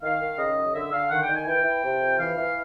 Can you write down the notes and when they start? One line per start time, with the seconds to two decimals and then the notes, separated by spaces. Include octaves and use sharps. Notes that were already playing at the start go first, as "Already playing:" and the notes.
0.02 D#3 F5
0.20 D#3
0.37 C#3 D#5
0.56 F#2
0.74 D3 E5
0.92 D3 F5
1.10 D#3 F#5
1.23 G5
1.28 D#3
1.34 G#5
1.46 E3 G5
1.64 E3
1.83 C3
2.00 F2
2.19 E3 F5
2.36 E3